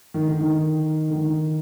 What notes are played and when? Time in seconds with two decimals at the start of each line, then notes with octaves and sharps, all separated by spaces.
0.14 D#3
0.27 D3
0.41 D#3
1.10 D3
1.15 D#3